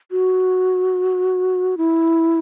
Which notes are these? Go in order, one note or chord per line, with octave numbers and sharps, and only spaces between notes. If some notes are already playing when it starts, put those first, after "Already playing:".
F#4
E4